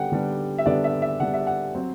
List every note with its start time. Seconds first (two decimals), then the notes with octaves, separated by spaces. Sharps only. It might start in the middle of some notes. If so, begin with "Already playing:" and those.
Already playing: D3 G3 B3 D4 F#5 G5
0.11 D3 G3 B3 D4
0.58 E5
0.66 D3 G3 B3 D4 D5
0.84 E5
1.02 E5
1.20 D3 G3 B3 D4 F#5
1.34 E5
1.47 F#5
1.74 F#3 C4